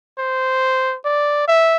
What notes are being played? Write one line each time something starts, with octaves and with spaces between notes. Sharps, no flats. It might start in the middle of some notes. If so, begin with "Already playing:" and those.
C5
D5
E5